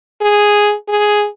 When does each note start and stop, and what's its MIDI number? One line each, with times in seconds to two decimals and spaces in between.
0.22 0.75 68
0.89 1.27 68